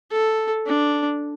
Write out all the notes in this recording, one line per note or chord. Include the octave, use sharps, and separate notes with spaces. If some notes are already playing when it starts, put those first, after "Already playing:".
A4
D4